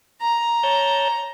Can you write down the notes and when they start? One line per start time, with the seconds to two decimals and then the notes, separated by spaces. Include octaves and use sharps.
0.21 A#5
0.63 C#5 A5 G6